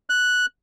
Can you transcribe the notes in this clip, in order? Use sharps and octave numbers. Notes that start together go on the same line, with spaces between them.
F#6